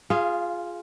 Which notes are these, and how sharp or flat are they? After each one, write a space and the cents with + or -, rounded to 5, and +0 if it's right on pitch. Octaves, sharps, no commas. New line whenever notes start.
F4 +0 G#4 +0 F5 -30